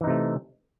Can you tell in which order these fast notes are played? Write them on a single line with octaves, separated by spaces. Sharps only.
E3 D#4 C3 A3